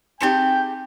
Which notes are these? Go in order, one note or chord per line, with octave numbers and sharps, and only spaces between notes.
C4 D#4 G4 G#4 G5 G#5 B5